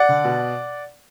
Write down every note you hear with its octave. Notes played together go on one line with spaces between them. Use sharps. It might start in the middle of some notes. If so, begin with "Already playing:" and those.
Already playing: D5 F#5
D3
B2